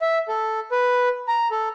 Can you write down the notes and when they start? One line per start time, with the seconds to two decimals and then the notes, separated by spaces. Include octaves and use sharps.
0.02 E5
0.28 A4
0.72 B4
1.28 A#5
1.51 A4